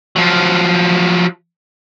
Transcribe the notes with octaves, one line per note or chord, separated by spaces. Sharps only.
F3 F#3